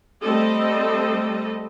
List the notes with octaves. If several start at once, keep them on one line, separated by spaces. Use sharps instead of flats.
G3 A3 C4 A4 D#5